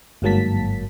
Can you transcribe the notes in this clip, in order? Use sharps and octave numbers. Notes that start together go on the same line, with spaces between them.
G1 G#2 F#3 A#3 A5 B6